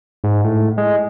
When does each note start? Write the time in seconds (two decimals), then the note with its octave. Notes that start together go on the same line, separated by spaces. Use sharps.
0.24 G#2
0.45 A2
0.78 G#3